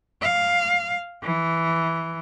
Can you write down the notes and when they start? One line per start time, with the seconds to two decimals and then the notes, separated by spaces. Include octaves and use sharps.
0.22 F5
1.23 E3